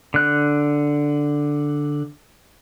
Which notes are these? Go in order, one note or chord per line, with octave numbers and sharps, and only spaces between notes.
D3 F#6